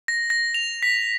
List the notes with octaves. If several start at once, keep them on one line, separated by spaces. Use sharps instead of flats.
A#6
A#6
F7
B6